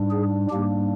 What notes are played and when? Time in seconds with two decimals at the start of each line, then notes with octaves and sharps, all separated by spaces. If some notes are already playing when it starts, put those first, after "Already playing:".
Already playing: G#2 G3 D4
0.11 G#4
0.50 G#2 G3 A#3 D4 G4